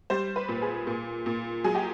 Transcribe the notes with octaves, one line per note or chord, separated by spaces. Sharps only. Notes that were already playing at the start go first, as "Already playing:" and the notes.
G3 C5
B4
A#2
G#4
A#2
A#2
F#3 G#4
G4